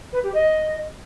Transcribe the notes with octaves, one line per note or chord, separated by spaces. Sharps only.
B4
G4
D#5